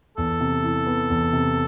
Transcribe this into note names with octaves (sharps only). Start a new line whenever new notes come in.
E2 A4
C3
E3
B3
E2
C3